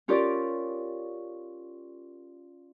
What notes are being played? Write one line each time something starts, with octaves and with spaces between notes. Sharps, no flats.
C#4 F4 G4 A#4 D5